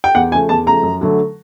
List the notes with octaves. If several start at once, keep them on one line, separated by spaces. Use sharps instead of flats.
G5
E2 F#5
C#3 F3 A3 G#5
E2 A5
C#3 F3 A3 A#5
F#2
D3 F#3 A3